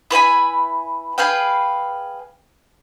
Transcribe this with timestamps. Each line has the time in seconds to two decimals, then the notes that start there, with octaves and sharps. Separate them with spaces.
0.11 E4 B4 G#5 B5
1.18 G#4 B4 F5 G5